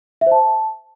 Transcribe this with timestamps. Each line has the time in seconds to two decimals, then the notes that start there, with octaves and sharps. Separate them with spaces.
0.21 E5
0.26 C5
0.31 A5